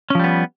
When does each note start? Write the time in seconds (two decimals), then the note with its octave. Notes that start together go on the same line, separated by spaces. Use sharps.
0.10 C#4
0.15 F3
0.20 G3
0.24 B3